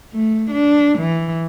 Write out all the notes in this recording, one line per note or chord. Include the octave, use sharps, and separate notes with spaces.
A3
D4
E3